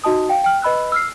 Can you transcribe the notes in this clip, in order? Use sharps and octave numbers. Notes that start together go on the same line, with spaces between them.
D#4 F#4 D#5 A5 D#6
F5 G5
G5 F6
B4 D#5 B5 E6 F#6
E6 F6 C7